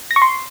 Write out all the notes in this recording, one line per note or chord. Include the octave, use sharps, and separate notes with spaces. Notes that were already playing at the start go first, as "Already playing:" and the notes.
A#6
C#6
C6